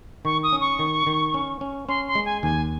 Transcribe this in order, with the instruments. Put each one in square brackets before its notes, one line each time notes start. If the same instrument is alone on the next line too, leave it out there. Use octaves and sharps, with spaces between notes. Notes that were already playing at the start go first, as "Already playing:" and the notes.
[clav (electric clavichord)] D#3 [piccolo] C#6
[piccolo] D#6
[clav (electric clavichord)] C#4
[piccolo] C#6
[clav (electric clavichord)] D#3
D#3
C#4
C#4
[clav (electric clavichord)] C#4 [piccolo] C6
[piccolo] C6
[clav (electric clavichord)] G#3
[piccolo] G#5
[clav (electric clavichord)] D#2 [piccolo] G#5